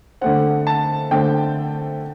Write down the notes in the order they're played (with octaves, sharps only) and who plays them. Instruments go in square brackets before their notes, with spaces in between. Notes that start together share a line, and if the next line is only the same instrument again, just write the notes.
[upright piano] D3 A3 C4 [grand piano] F#5
[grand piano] A5
[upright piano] D3 A3 C4 [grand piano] G5